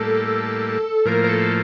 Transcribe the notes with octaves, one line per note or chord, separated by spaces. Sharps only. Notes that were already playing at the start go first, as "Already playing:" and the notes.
Already playing: A2 G3 A#3 A4
A2 F3 A#3 A#4
A#4
A4